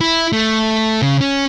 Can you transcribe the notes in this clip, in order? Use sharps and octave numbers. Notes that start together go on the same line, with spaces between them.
E4
A3
C#3
C#4